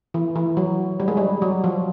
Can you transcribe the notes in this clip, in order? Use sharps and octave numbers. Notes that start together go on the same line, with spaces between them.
E3
E3
F#3
G3
G#3
G3
F#3
F3